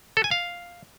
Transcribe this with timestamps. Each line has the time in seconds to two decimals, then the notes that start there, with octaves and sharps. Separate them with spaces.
0.17 A4
0.24 G#5
0.31 F5